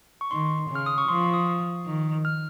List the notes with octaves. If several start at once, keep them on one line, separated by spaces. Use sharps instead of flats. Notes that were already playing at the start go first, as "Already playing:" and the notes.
C#6
D#3 C6
C#3
F6
D#6
C#6
F3 C6
C#6
D#6
D#3
F6